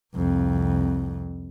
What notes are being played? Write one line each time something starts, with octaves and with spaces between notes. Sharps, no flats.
C2 F2